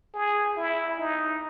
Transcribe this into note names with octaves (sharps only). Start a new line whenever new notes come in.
G#4
E4
D#4